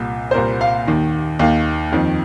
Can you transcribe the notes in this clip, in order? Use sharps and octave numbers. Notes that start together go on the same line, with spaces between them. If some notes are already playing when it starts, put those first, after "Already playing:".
Already playing: C2 A#2
C5
C2 A#2 A#4
F5
D#2 D#3
D#2 D#3 F5
F2 D#3